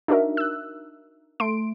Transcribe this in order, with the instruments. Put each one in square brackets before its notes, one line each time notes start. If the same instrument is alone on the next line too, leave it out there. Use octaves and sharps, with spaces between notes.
[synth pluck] D4 D#4 F#4 A#4 E5
E6 F#6
A3 C6 D7